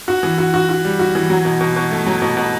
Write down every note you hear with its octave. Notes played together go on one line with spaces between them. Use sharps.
F#4
E3
F#4
F#4
F#4
G3
F#4
E3
F#3
B2
B2
B2
A3
F#3
B2
B2